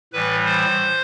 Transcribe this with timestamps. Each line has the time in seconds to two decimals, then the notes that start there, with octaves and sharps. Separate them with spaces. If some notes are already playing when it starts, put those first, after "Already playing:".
0.13 A2 E3 G3 B4
0.45 C5